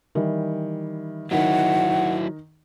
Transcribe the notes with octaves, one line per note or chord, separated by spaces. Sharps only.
D#3 E3 G3
D#3 F#3 D#4 E4 F#5